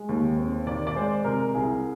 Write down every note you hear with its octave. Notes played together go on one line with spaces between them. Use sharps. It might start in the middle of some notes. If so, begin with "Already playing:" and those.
Already playing: G#3
D#2
C4
D#3 D5
D5
G#3 C5
C3 A#4
C2 G#4